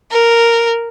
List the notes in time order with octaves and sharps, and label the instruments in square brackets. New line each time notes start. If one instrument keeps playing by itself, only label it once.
[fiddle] A#4